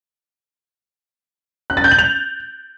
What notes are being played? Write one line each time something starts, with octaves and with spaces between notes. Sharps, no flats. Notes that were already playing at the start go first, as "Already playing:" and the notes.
F#6
A6
G6
F#7
F7